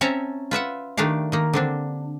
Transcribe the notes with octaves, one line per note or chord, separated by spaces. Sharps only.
C4 C#4 C#5 E5 A5 A#5
F4 B4 E5 F#5
D#3 A3 D4 G4 F5
D#3 A#3
D3 C4 D4